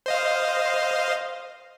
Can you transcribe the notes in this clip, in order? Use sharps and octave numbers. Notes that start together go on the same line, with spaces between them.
C5 D#5 F5